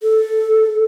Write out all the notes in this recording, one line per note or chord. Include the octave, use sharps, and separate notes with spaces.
A4